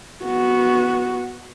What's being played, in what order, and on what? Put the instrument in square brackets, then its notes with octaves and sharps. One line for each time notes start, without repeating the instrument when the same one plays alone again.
[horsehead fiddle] B3 F#4